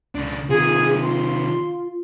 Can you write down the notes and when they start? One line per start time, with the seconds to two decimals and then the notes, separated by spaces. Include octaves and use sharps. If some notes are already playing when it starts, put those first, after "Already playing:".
0.15 C#2 C#3 D4
0.49 C3 D#3 F4 G#4
1.02 C6